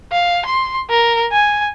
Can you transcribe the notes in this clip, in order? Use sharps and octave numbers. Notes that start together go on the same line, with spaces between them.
F5
C6
A#4
G#5